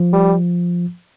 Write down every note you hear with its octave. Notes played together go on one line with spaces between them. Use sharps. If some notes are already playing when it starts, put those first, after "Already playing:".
Already playing: F3
G3